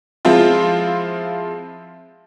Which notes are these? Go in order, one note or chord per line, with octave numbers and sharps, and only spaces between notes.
F3 G#3 C4 E4 F4